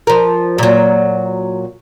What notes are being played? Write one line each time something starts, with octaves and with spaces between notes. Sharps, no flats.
F3 A#4
A#2 F#3